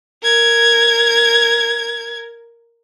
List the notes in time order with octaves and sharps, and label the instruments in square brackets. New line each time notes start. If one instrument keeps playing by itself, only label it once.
[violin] A#4 G#6